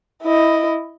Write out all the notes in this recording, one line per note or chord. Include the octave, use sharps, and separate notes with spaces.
E4 D#5